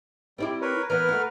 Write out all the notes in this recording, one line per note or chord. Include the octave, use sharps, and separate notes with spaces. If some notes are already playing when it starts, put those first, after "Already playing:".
G3 C4 E4 G4
A#4 B4 C#5
E3 B3 A#4 B4 F6
A3 F#4